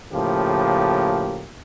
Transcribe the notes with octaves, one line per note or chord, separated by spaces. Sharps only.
A2 C#3 F3 A#3 G4